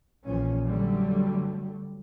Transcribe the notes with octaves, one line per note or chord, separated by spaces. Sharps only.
A#1 A#2 E3 F3 C#4
G2 D3 F#3 G3 A3